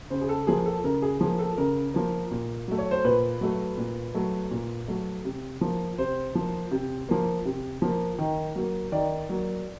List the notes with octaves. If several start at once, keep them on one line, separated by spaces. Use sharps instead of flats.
C#3 C5
G#4
A4
F3 A#3 G#4
A4
C#3 A#4
G#4
F3 A#3 G#4
A4
C#3 A#4
F3 A#3
A#2
F#3 A3
C#5
C5
A#2 B4
F#3 A3
A#2
F#3 A3
A#2
F#3 A3
C3
F3 A#3
C3 C5
F3 A#3
C3
F3 A#3
C3
F3 A#3
D#3
F#3 A#3
D#3 D5
F#3 A#3